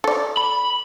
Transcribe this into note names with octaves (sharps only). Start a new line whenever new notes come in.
A4 D5
B5